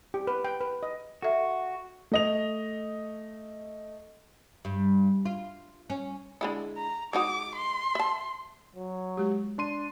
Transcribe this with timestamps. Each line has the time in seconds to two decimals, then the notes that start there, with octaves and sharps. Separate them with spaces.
0.14 G4
0.27 B4
0.44 G5
0.61 B4
0.83 D#5
1.22 F#4 A4 E5
2.12 A3 D#5 F7
4.65 G2
5.25 F4
5.90 C#4
6.41 D3 G#3 E4
6.77 A#5
7.13 G#3 D#4 F#4 D6
7.55 C6
7.95 E5 A5
8.76 F#3
9.17 G#3 G4
9.58 D4 C6 D#7